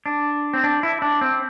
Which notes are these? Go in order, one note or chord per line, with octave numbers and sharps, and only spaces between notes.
D4
C4
D4
E4
D4
C4